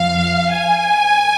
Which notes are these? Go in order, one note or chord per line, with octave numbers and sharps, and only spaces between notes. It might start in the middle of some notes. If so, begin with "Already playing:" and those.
Already playing: F2 F3 F5
G#5